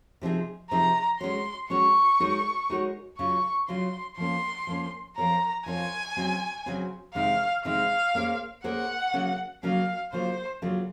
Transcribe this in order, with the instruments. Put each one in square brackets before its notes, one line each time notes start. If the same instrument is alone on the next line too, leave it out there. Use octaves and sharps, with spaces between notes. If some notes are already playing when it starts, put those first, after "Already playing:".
[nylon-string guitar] C3 F3 C4 D#4 G#4
[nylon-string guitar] C3 F3 C4 D#4 G#4 [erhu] A#5
[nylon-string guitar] G#3 C#4 F#4 C#5 [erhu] C6
[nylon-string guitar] G#3 C#4 F#4 C#5 [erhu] C#6
[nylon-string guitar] G#3 D#4 F#4 A#4 C#5
G#3 D#4 F#4 A#4 C#5
[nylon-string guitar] C#3 F#3 C#4 F4 [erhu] C#6
[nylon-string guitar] C#3 F#3 C#4 F4 [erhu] C6
[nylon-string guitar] F3 A#3 C#4 [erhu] C6
[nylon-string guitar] F3 A#3 C#4
[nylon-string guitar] F3 C4 F4 A#4 C#5 [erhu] A#5
[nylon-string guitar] F3 C4 F4 A#4 C#5 [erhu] G#5
[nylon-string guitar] C#3 F#3 C4 F#4
C#3 F#3 C4 F#4
[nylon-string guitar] C3 D#3 G#3 C4 D#4 [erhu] F5
[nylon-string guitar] C3 D#3 G#3 C4 D#4 [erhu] F5
[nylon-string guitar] A#3 C#4 G#4 C5
[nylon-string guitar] A#3 C#4 G#4 C5 [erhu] F#5
[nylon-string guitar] C#3 F#3 A#3 C#4
[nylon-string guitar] C#3 F#3 A#3 C#4 [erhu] F5
[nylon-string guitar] C#3 F#3 A#3 F4 [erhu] C5
[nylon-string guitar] C#3 F#3 A#3 F4